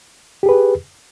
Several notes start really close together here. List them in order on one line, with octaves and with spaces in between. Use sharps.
G4 G#4 B4